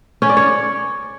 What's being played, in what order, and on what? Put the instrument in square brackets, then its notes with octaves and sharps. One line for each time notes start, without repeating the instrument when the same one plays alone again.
[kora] C#4
D5
C#5